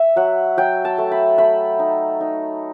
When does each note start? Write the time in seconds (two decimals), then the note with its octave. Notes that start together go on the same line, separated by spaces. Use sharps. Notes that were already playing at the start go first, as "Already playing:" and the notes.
Already playing: E5
0.16 F#3 F#5
0.57 F#3 G5
0.85 A5
0.98 A3
1.12 B5
1.38 A3 B5
1.79 D#4
2.21 D#4